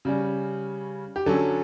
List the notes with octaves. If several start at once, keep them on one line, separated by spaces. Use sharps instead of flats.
C#3 G3 C#4
G4
D3 F#3 C#4 A4